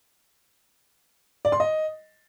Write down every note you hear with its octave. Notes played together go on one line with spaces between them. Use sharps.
D5
C6
D#5